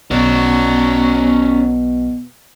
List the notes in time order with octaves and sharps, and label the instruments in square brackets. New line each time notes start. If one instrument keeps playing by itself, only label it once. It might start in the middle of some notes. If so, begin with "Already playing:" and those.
[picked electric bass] B1 [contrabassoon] B2 [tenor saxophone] F#3 [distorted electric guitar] C#4 D5